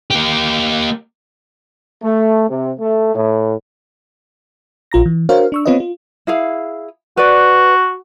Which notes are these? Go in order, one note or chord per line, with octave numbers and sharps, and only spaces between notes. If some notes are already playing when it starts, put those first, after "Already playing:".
A#3 G4
A3
C3
A3
A2
A#1 F4 A#5 A#6
E3
D4 F#4 A#4 C5 C#5 F5
D4 C#6 E6
B3 C4 F4 B4 C#5 D#5
F4
E4 G#4 F5
F#4 B4 D5